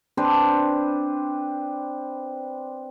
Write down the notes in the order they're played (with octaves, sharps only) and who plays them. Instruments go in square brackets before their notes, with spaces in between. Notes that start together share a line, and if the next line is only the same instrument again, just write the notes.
[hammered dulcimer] C4 D4 B4 C5